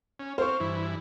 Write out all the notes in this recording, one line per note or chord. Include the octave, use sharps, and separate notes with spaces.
C#4
C4 C5 F5 C#6
G2 E3 E4